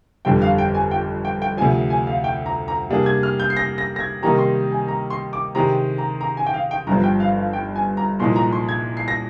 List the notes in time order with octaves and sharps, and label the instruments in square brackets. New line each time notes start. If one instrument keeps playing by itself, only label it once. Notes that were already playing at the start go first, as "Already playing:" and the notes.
[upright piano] G1 F2 D3 G3 C4 [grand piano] G5
[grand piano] F5
G5
G#5
G5
G5
G5
[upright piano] D2 C3 F3 [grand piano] G#5
[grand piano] G#5
F5
G5
A#5
A#5
[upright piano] C3 G3 A#3 D4 G#4
[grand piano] G#6
F6
G6
C7
A#6
A#6
A#6
G#6
[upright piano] C3 D#3 G3 A#3 D#4 [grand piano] A#5
[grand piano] C6
G#5
A#5
C6
D6
[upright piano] C3 D#3 G#3 C4 G4 [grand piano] A#5
[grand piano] A#5
A#5
G#5
G5
F5
G5
[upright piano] G1 G2 F3 [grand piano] A#5
[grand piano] G5
F5
F5
G5
G#5
A#5
[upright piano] C2 A#2 F3 G#3 D#4 [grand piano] C6
[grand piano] A#5
C6
G#6
C7
A#6